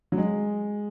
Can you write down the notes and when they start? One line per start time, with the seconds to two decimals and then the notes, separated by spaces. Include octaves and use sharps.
0.12 F#3
0.17 G#3